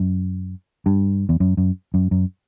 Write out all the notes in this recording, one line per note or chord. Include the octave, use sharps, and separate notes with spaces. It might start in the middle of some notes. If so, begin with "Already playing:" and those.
Already playing: F#2
G2
E2
F#2
F#2
F#2
F#2